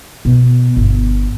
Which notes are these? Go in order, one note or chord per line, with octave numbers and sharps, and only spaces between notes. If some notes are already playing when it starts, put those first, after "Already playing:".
B2
G1